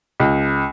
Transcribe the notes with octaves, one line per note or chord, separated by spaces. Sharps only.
C#2